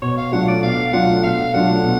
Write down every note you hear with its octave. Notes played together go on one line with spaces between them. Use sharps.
B2 C#5
F5
F#3 A3 D4 F4 F#5
D5
B2 F5
F#3 A3 D4 F4 F#5
B2 F5
F#3 A3 D4 F4 F#5
B2